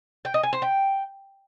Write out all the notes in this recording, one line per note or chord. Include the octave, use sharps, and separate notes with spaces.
G5
D#5
G#5
C5
G5